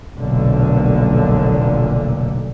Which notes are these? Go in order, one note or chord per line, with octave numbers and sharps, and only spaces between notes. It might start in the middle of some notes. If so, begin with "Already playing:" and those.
F1 B1 A#2 D3